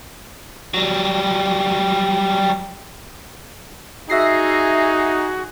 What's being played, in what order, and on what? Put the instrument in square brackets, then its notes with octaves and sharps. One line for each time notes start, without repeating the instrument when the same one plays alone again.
[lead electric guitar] F#3 G3
[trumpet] D#4 [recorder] F#4 [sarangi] G#4 [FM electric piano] E5 A#6 C7